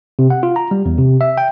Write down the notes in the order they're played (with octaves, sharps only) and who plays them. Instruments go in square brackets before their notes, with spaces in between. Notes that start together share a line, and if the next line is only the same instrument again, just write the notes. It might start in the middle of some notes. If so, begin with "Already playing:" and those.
[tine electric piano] C3
F#5
F4
A#5
G3
E2
C3
E5
G5